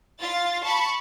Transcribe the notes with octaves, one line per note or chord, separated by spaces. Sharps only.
F4 A6
A5 B5 C#6